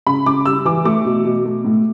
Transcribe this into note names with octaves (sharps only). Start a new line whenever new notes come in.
C#3 B5
C#3 D6
G3 E6
E3 D6
A3 D6
B2
B2
A3
A2